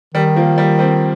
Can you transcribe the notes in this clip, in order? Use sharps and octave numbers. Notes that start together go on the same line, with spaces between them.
D#3 G3
F3 A#3
G3
G3 C4